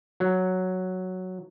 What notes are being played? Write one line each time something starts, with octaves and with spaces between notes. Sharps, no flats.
F#3